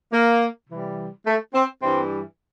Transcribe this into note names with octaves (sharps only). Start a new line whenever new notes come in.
A#3
C3 E3 G3
A3
C4
G2 E3 G3 C4